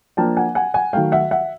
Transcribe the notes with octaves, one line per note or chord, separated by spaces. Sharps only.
F3 A#3 D4 G5 A5
F#5 G#5
F#5 G#5
F#5 G#5
D#3 F#3 A3 F5 G5
E5 F#5
E5 F#5